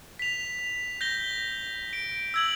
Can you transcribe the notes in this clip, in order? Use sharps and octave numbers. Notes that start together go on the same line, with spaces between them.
B6 F7
G6 A#6 G7
D7
E6 G#6 F#7